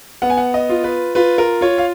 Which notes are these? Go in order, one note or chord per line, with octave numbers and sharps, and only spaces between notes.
B3 F#5
G#5
F#5
D#5
F4
B4
F4 B4
A#4
F4 C#5
F5